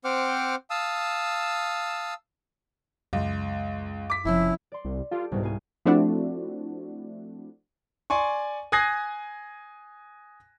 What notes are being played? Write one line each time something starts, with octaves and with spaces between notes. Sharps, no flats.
C4 C5 F#5 G5 D6 F6
F5 A5 D#6 E6
C#2 F#2
D6 B6
F#1 C3 F3 C#4 E4
D5 C6
C2
F4 G4 A4
C2 G#2 B2
F5 G#5
F3 A3 C4 D4 E4 F#4
D5 G#5 C6 C#6
G#5 D#6 F#6 G#6 A#6 C7